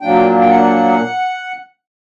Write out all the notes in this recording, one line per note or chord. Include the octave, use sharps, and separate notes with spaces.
A#2 F#3 A#3 D4 G5
G5
F#5